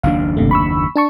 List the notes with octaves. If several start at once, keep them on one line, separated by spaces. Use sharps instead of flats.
F#1 D#2 D4 F5
G1 C3 A3
B5 C#6 E6
D4 A5 C#6